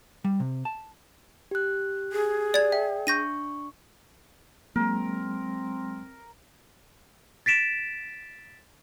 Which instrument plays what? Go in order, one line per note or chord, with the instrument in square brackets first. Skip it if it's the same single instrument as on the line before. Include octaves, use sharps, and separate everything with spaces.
[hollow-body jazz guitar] G3
C3
A5
[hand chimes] G4 F#6
[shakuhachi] G#4
[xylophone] D5 G#6
[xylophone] E5 [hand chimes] G5
[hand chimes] D4 C#6 [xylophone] G6 A#6 D#7
[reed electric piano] F#3 G#3 [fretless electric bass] A#3 [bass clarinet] C4 [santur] A#4
[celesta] A6 B6 D7 E7